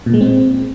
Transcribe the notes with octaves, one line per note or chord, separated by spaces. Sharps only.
A#2
G#3
C4